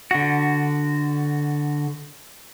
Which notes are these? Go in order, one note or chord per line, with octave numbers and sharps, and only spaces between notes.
D3 F#4